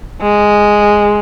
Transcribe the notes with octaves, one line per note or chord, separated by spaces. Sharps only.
G#3